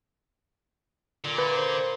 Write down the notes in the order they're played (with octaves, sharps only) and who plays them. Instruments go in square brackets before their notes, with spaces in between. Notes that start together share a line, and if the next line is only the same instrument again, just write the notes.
[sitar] A#2 [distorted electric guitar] D3
[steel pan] B4
[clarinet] C5